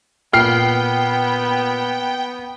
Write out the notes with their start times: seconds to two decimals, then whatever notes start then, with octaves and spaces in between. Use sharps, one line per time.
0.33 A#2 B3 G5 F6 C7